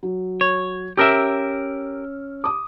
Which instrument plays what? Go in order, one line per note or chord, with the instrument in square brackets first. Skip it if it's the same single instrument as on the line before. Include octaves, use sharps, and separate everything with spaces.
[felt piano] F#3
[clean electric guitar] C#5
[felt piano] C#4 E6 F6 [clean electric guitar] G4 A#4 E5
[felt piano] D6 D#6